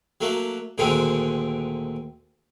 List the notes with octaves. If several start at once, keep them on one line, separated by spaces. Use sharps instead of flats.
F#3 A3 A#3
D2 A#2 D3 D#3 G#3 C4